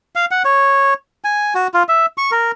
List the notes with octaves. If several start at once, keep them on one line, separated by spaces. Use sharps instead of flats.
F5
F#5
C#5
G#5
F#4
F4
E5
C#6
A#4